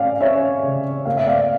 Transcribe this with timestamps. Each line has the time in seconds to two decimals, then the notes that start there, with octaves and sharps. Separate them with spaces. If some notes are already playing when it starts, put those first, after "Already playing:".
Already playing: C#4 D5 F5
0.21 C#4 C#5 E5
0.63 C#3
1.05 A#3 F5
1.17 E5
1.27 D5 F5